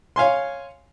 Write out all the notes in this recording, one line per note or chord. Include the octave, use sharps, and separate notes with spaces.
C#5 F5 G#5 C6